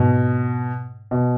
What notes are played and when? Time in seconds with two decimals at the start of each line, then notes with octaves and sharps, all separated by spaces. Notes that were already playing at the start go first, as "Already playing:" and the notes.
Already playing: G#2 B2
1.11 B2